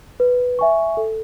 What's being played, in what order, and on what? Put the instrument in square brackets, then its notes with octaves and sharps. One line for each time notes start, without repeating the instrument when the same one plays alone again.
[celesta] B4
E5 G#5 C#6
A4